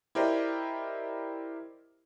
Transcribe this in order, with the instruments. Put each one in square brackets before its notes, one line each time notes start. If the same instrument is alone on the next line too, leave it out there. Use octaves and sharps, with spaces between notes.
[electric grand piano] E4 G4 A#4 C5 D5 D#5